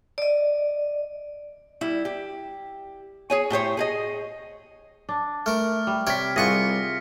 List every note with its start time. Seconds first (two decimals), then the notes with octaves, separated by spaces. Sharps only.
0.18 D5 D#5
1.81 G3 E4
2.05 G4
3.30 G#4 C#5 G#5
3.50 A2 G4 C5 C#5
3.77 G#4 A4 D#5
5.09 D4
5.46 A3 A#4 F6
5.87 G3
6.07 C3 C#5 D5 F6 B6
6.36 C2 F4 G#4 F#5 C#6 A#6 C#7